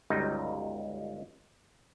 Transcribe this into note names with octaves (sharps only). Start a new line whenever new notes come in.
G1 C#2 F#3 G3 D#4